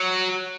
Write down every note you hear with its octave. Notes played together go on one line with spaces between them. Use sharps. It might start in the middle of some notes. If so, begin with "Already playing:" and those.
Already playing: F#3